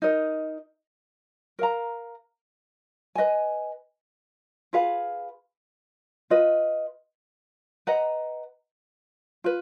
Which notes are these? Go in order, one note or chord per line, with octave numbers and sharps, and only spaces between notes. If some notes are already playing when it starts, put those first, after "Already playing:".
D#4 A#4 D#5
A#4 F5 A#5
B4 D#5 G#5
F4 G#4 B4 F5
F4 B4 D#5
B4 D#5 F#5 A#5
F4 B4